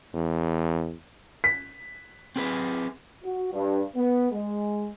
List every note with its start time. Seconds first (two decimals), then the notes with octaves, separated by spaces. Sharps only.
0.14 E2
1.44 B6
2.36 C4 G#4 B4
3.24 F#4
3.52 G2
3.96 B3
4.32 G#3